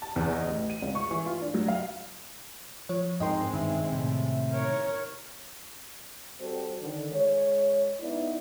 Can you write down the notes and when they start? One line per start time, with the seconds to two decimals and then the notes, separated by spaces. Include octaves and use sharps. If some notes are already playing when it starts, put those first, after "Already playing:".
0.02 A5
0.16 E2
0.33 D#5
0.47 A1
0.70 D#7
0.82 C#2
0.95 C#6
1.11 E3
1.26 F4
1.42 D4
1.54 F#3
1.68 F5
2.89 F3 C#5
3.20 G#2 G#3 C4 D#4 A#4 D#5 G5 C6
3.54 G2 B2 D#3 E5
3.93 A2 C3
4.52 A#4 C#5
6.40 G3 C4 F#4 A4 C5
6.81 D3 D#3
7.12 G#3 C#5
8.01 B3 D#4 E4 D5